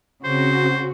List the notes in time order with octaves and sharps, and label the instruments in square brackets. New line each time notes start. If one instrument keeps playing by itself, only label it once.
[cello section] C#3 C4 F#4 [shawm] C5